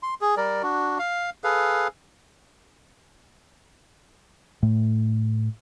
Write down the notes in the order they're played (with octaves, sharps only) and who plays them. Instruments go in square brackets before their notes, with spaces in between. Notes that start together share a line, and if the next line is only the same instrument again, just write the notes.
[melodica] C6
G#4
G3 A#4 D5
D4 F#4
F5
G#4 A4 B4 F5
[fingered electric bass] A2 A3